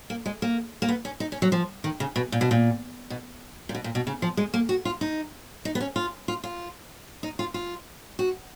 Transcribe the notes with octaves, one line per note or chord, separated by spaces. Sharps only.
A#3
G#3
A#3
A#3
B3
C#4
D#4
C#4
F#3
F3
D#3
C#3
B2
A#2
B2
A#2
B2
A#2
B2
A#2
B2
C#3
F3
G#3
A#3
F#4
F4
D#4
D#4
B3
C#4
F4
F4
F4
D#4
F4
F4
F#4